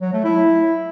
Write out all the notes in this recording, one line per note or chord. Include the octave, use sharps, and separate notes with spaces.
F#3
A3
E4